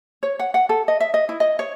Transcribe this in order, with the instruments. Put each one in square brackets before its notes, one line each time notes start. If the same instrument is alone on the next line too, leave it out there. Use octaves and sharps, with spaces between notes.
[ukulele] C#5
F#5
F#5
A4
D#5
E5
D#5
E4
D#5
C#5